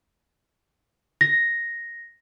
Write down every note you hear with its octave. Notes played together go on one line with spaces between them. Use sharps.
A#6